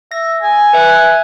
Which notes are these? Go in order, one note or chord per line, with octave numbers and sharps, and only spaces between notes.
E5 A#6
G#5
B4 E5 F#6